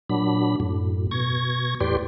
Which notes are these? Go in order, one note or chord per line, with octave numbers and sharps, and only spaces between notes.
A#2 F#3 D4 B5
F#2 A2
B2 C#6 G#6 A#6
E2 A2 G4 B4 D5 C6